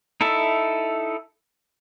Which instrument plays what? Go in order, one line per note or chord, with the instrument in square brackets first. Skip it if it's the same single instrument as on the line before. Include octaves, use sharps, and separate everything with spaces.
[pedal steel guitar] D#4 E4 A4 E5